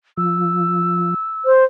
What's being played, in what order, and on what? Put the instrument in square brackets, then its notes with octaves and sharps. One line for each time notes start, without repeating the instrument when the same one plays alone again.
[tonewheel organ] F3 [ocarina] E6
[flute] C5